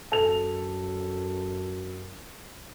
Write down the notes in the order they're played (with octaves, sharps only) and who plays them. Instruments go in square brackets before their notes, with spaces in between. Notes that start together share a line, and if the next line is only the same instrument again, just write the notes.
[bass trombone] F#2 [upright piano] A4 F7